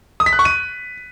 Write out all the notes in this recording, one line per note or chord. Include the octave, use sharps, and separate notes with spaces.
D#6
B6
F#6
C#6
D#7